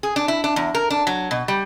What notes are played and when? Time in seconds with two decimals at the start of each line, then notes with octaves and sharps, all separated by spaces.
0.03 G#4
0.16 D4
0.28 E4
0.44 D4
0.56 E2
0.75 A#4
0.90 D4
1.07 F#3
1.31 B2
1.48 G3